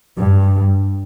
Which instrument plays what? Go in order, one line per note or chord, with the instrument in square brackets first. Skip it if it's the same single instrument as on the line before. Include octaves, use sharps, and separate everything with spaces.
[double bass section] G2